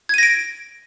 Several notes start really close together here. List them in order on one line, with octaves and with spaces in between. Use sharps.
G#6 D#7 A#6 D7